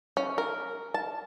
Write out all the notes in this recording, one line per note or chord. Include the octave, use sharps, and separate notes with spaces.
C#4
A#4
A5